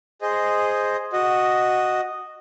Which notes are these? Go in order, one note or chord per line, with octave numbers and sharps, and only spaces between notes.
G#4 C5 D#5
F#4 D#5